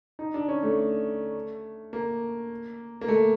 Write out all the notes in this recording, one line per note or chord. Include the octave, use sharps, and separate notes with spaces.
D#4
D4
C#4
A3
A#3
A#3
A3